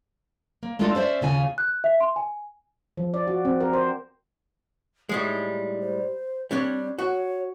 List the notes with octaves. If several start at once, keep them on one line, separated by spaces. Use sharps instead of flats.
A#3
G#3 A3 D4 D#4 F4 A4
C#4 C5 D5 E5
D#2 C#3 F4 G#5
F#6
E5
C6
G#5
F3
D5
F#4
C4
A#4
C5
A2 G3 G#3 D#4
C5
G3 C4 D4 C#5
F#4 C#5